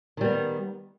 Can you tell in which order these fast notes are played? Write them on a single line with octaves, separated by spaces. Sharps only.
D#3 G3 B3